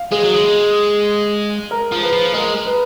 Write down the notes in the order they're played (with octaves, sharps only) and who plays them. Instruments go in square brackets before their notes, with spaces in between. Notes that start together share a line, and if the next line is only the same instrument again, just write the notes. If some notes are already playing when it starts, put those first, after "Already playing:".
Already playing: [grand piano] F5
[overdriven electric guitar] G#3 [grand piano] G#4
[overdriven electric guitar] F#3
G#3
[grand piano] A#4
[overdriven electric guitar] F3
[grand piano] B4
[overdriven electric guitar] F3
[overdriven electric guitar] G#3 [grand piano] A#4
[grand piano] B4